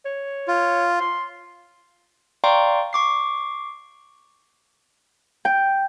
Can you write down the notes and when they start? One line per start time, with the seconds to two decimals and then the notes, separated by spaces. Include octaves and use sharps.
0.05 C#5
0.48 F4
1.00 C6
2.44 D5 F5 G5 A#5 C6 C#6
2.93 C#6 D6 C7
5.45 G5